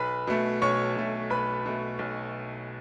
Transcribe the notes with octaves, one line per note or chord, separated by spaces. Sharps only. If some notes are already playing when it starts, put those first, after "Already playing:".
Already playing: B1 B4 B5
B2 A3
B1 C#5 C#6
B2 A3
B1 B4 B5
B2 A3
B1